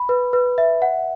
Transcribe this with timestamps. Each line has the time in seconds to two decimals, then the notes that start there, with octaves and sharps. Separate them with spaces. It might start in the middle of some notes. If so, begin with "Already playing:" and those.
Already playing: B5
0.09 B4
0.33 B4
0.58 E5
0.82 F#5